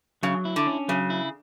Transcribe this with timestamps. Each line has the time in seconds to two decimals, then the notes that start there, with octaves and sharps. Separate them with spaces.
0.23 C#3 F#3
0.45 E4
0.56 D3
0.67 C#4
0.88 C#3 F#3
1.10 E4